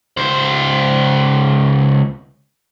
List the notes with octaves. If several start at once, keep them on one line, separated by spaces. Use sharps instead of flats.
C#2 C5